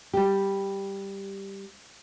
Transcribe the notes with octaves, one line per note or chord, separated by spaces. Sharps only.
G3 G4